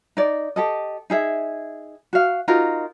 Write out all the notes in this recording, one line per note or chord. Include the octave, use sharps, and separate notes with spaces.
D#4 D5
G4 A4 D#5
D#4 G#4 E5
F#4 F5
D#4 F4 F#4 A#4